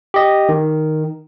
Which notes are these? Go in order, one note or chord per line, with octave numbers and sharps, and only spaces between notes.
G4 D#5
D#3